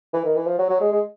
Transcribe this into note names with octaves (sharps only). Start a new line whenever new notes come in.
E3
D#3
E3
F3
F#3
F#3
G#3
G#3